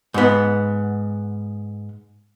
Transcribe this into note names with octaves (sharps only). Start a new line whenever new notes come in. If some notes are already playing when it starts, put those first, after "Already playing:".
G#2 B3